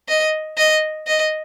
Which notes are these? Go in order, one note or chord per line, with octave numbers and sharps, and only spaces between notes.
D#5
D#5
D#5